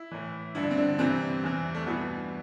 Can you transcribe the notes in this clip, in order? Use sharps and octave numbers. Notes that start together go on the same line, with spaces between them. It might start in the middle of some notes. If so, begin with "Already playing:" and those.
Already playing: E4
A2 E3
G2 D3 E4
D4
C4
D3 D4
G2 C3 E3 C4
E2 C3 E3
A3
G2 B2 E3 B3